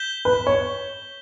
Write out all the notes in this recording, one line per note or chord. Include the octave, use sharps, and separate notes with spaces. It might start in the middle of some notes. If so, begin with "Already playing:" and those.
Already playing: G6 B6 E7 G7
B4
C#5